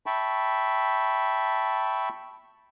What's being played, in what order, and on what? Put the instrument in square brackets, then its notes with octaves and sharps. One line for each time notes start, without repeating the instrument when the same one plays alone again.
[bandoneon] E5 G5 A5 B5 C#6